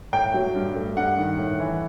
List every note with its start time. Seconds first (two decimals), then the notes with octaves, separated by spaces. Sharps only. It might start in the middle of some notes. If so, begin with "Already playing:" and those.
0.13 A2 G5
0.34 F#3
0.55 G2
0.76 A3
0.97 G2 F#5
1.17 D#3
1.38 A2
1.59 E3